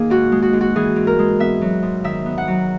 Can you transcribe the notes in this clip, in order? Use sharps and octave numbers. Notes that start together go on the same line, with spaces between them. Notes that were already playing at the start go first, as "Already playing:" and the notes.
Already playing: D#3 A#3 D#4 G#4
G#2 F#4
G#3
F#4
G#2
F#4
E3 G#4
G#2
A#4
G#3
B3 E5
F#3
G#2
D#3 E5
B3
F#5
F#3